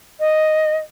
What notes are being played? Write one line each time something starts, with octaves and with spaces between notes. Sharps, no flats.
D#5